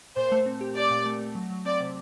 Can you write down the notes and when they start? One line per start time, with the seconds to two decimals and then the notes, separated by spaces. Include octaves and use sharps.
0.17 A#2 C5
0.32 A3
0.46 C4
0.61 G4
0.76 G4 D5
0.91 A#2
1.06 A3
1.21 A3
1.35 F#3
1.50 F#3
1.65 C4 D5
1.80 C3